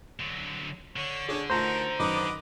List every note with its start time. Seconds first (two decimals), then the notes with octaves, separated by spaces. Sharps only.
0.20 D3 F#3
0.96 D3 C#5
1.29 D4 G#4 C#5 D5
1.50 A3 D#4 F4 F#4 A#4 C5 A5 A#5
2.00 F#2 D#3 B4 D#5 D6